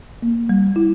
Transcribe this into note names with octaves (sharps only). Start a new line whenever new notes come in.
A#3
G3
E4